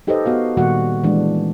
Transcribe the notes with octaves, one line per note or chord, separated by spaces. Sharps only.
D#4 G4 A4 B4 C5 D#5
B3 F#4 F5
A#2 D#3 G3 A#3 F#4 F#5
E3 G#3 D4